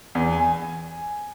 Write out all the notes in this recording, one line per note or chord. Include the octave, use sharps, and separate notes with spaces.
E2
G#5